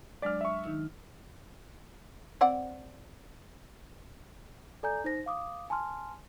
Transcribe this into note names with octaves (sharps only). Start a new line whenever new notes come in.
F#3 G#3 D4 D5 F6
E5 C#6
D#3 D#4 E6
C4 D5 F#5
A4 D5 G#5 A#5 G6
D#4 C5 A#6
F5 D6 D#6
G#5 A5 C6 F6